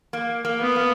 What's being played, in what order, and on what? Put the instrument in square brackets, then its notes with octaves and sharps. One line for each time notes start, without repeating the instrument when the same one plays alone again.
[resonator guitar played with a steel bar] A#3
A#3
[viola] B3
[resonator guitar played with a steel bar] A#3